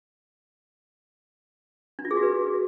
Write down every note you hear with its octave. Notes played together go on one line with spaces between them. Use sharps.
D4
F4
G#4
F#4
B4